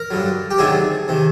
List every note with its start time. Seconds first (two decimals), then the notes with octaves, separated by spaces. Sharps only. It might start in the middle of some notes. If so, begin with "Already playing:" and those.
Already playing: A#4
0.11 G2 D3 F#3
0.51 G4
0.58 D2 C3 D#3 F#3 A3 G#4
1.08 C3 D#3